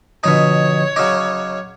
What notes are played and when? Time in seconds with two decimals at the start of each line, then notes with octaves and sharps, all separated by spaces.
0.24 B2 D3 F3 D#4 C#5 D#6
0.96 C#3 F#3 D#4 D6